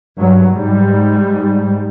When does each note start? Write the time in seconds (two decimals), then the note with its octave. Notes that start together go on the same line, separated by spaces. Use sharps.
0.19 G2 F#3
0.55 G#2 G3